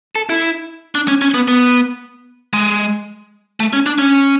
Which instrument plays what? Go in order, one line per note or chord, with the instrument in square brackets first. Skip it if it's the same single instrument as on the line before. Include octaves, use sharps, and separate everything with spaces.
[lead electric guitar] A4
E4
D4
C#4
C#4
B3
B3
G#3
A3
C#4
D4
C#4